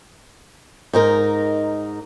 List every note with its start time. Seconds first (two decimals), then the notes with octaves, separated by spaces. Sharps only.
0.93 G#2 D#4 A#4